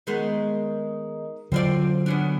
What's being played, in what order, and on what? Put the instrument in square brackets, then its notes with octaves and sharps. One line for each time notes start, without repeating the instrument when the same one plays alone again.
[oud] D#3 G#3 B3
[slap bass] D3 F#3 [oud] C4 F4 D5
[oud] B3 C#4 D4